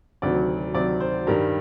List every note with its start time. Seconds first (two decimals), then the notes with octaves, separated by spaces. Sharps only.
0.22 D2 C3 D#3 F#3 D5
0.74 D2 C3 D#3 F#3 D5
1.00 C5
1.27 G2 D#3 G3 A#4